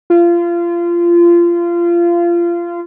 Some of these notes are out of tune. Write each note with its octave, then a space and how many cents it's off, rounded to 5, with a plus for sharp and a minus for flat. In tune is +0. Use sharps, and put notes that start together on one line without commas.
F4 -25